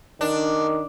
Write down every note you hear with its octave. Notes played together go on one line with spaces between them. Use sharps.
D#3 D4